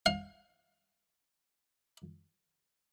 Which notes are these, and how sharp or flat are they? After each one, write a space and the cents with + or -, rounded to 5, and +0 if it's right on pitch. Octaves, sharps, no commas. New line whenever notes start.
F5 +30